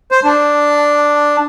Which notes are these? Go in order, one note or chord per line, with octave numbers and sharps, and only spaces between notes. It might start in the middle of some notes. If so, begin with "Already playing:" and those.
C5
D4